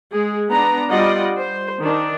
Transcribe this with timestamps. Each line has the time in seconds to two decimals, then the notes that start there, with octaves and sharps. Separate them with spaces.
0.11 G#3 G#4
0.50 B3 D4 A#5
0.89 G3 F4 D5 D#5 F#5
1.38 C5
1.81 D#3 D4